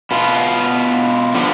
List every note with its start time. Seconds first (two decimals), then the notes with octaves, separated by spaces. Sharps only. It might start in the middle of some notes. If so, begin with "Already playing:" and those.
0.11 B2 B3 F4
1.34 D3 F3 B3 D4